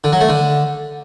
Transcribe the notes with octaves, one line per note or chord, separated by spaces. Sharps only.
D3
F#3
A3
D3